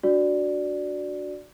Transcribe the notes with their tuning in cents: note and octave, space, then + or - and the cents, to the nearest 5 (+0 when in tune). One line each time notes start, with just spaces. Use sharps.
D4 +0 F#4 +0 D5 +0